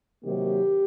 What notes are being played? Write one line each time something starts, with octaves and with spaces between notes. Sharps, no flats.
C3 D#3 F#3 A#3 D#4 G4